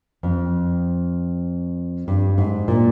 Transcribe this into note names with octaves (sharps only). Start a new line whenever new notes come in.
F2
G2
G#2
A#2